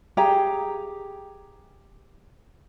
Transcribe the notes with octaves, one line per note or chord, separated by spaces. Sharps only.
G4 G#4 G5 A#5